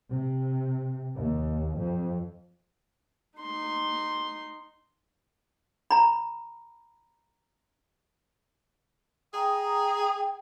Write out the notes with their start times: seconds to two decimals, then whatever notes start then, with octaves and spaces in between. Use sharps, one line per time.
0.12 C3
1.16 D#2
1.78 F2
3.39 D#4 C6
5.91 A#5 B5
9.34 G#4 G5 A#5 D#6